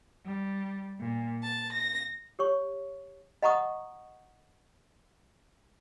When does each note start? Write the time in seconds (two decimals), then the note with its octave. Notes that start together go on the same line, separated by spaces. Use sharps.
0.25 G3
0.99 A#2
1.43 A5
1.73 A#6
2.39 G4 C#5 C#6
3.42 D#5 F#5 A#5 C#6 D#6